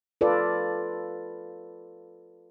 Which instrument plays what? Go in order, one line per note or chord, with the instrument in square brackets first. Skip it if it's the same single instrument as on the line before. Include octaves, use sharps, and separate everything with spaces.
[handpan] F4 A4 B4 D5